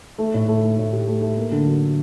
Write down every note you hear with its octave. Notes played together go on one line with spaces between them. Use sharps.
A3
A2
A3
A3
A2
G4
A3
A3
A#3
D3
F#3